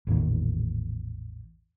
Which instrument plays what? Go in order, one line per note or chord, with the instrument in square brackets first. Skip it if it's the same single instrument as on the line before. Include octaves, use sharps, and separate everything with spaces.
[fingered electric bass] A1 E2 A#2 D#3